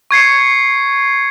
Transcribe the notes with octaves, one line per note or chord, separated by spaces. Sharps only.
C#6 G#6 C7 C#7